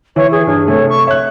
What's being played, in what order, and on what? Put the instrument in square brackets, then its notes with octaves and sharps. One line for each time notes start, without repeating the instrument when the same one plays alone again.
[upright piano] E3 E5 [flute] C#5
[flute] G#4
[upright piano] G2 [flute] G#4
[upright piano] C3 A3 [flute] C#5
[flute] C#6
[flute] C#5 [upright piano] E5 F#6